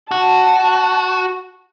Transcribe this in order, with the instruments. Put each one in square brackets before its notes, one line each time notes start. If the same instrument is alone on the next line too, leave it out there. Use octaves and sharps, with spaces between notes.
[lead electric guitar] F#4 [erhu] A5